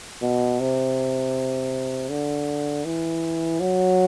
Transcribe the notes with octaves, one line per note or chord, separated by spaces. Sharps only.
B2
C3
D3
E3
F#3